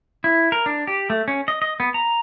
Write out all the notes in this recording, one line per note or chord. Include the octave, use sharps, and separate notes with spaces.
E4
A#4
D4
G4
A3
C#4
D#5
D#5
B3
A#5